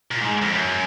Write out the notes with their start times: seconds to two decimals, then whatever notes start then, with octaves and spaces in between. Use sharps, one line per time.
0.12 A#2
0.21 G#2
0.42 F2
0.52 F#2